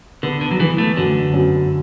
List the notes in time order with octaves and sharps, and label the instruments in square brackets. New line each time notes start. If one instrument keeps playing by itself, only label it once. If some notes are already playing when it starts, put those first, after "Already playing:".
[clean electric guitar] D3 [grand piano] B3
[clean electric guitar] D3
F#3
[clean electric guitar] E3 [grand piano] B3
[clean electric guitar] A3
[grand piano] F#2 [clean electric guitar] D3
[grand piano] F#2